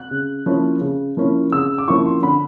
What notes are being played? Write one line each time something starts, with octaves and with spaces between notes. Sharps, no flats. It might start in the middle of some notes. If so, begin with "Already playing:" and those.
Already playing: F#6
C#3
F3 A#3 C#4 E4
C#3
F3 A#3 C#4 E4
C#3 E6
D6
F3 A#3 C#4 E4 C#6
C6
D3 B5